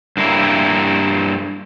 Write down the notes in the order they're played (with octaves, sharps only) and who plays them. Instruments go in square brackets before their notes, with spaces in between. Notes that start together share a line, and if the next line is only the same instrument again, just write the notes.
[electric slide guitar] G2 A#3 E4